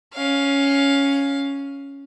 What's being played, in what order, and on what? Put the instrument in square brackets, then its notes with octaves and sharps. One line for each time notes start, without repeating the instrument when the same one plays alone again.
[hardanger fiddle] C#4 F5